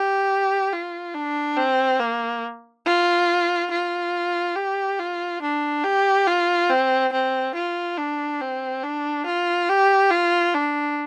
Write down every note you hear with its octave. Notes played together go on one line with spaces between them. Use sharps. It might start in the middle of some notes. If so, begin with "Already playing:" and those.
Already playing: G4
F4
D4
C4
A#3
F4
F4
G4
F4
D4
G4
F4
C4
C4
F4
D4
C4
D4
F4
G4
F4
D4